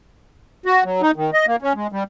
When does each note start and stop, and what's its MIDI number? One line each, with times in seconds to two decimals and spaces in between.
0.66 0.83 66
0.85 1.02 54
1.02 1.11 63
1.16 1.31 51
1.33 1.46 75
1.47 1.56 58
1.62 1.73 61
1.75 1.87 56
1.92 2.03 55